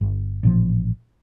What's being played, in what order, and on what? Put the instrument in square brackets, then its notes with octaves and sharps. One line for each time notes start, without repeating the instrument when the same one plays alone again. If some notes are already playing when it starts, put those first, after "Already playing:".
[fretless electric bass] G1
A1 A#2 F3